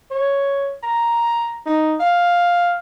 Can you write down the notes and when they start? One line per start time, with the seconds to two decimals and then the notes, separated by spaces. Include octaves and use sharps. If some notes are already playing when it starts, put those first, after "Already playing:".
0.11 C#5
0.83 A#5
1.66 D#4
2.00 F5